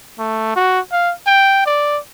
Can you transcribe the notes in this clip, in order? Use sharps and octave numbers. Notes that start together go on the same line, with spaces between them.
A3
F#4
F5
G5
D5